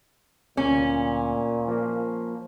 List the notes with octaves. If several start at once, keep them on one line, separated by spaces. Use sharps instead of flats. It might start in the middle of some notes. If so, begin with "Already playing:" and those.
D2 A#2 C#4
F3 A#3